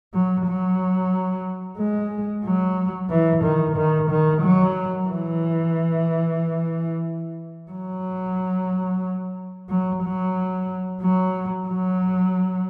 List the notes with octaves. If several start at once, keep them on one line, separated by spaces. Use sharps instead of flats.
F#3
F#3
G#3
F#3
E3
D#3
D#3
D#3
F#3
E3
F#3
F#3
F#3
F#3
F#3